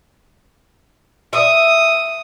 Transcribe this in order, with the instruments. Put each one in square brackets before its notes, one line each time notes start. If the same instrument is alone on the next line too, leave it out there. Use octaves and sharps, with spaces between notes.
[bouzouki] E5 [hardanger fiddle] D#6